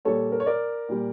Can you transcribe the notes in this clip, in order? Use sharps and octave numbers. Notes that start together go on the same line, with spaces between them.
A#2 G3 A4 C#5
A#4
C#5
A#4 D5
A#2 G3